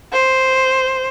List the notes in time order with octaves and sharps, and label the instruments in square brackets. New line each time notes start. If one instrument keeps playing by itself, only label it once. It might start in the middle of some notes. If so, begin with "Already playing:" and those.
[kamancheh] C5